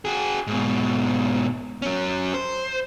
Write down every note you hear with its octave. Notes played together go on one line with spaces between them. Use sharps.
F#4 G#4
G#2 B2
F#3 C#4
C5